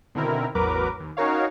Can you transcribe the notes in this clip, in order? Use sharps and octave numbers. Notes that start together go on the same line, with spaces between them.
B2 D3 D#3 C4 E4 A#4
A1 E2 F#3 A#4 B4 D6
D#2
C#4 D#4 F#4 A#4 C#5 F5